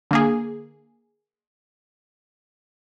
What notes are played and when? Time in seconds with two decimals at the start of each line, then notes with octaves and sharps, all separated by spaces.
0.11 D3 A#3 G#4